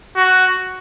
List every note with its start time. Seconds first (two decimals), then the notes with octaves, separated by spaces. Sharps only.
0.17 F#4